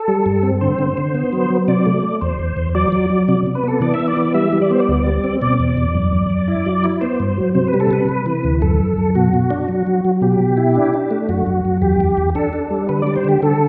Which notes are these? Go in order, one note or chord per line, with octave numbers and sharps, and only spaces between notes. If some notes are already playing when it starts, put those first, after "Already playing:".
Already playing: A4
G3
G2
C4
D3 C5
D3
D3
B3
F#3
F#3
C3 D5
A3
A3
E2 C5
E2
E2
F#3 D5
F#3
F#3
C3 D5
C3
B4
B3 A4
E3 D5
E5
B3
D5
E3
G3 E5
G3
D5
B3 C5
D5
D2
G3
C4
B2 D5
E2
E2
F#2
F#2
F#2
E4
F#3
E4
B3 C5
G2
F#3
C3 C5
B4
G3
A4
C3 B4
C3
E3
D2
F#2 A4
F#2
F#2
B2 F#4
B2
D4
F#3
F#3
F#3
B2 G4
B2
E4
D4
D4
A3
F#2 F#4
F#2
F#2
E2 G4
E2
E2
D4 A4
D4
G3
D3 B4
G3 D5
C5
D3 G4
D3 A4